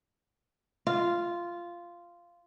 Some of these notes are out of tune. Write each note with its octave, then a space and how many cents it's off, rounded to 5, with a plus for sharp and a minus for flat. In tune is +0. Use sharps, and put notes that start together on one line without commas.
F4 -10